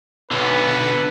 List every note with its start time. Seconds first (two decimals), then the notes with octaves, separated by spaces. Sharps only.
0.31 B1 D3 B3 B4